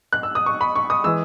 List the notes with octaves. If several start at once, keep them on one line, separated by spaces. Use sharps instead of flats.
F#6
E6
D#6
C#6
B5
C#6
D#6
E3 G#3 E6